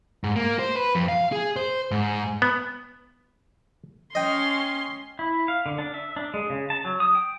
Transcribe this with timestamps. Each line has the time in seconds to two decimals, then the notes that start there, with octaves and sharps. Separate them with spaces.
0.24 G#2
0.36 A#3
0.59 C5
0.76 B4
0.95 F2
1.08 F5
1.32 G#4
1.56 C5
1.91 G#2
2.42 B3
4.15 C#4 D#5 G5 C6
5.19 E4
5.48 F5
5.66 D3
5.78 D4
5.94 E5
6.16 D4
6.34 G#3
6.50 C#3
6.70 A5
6.85 F#3
7.00 D#6
7.15 G5